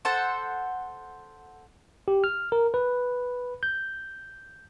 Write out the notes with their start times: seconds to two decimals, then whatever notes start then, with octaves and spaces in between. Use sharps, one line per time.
0.05 A4 C5 F#5
2.08 G4
2.24 F6
2.52 A#4
2.74 B4
3.63 G6